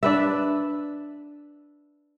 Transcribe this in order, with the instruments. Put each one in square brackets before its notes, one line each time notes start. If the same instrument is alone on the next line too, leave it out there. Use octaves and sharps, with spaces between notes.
[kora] D4 B4 E5